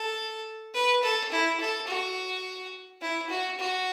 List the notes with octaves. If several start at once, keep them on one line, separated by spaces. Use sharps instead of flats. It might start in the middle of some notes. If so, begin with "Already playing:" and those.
Already playing: A4
B4
A4
E4
A4
F#4
E4
F#4
F#4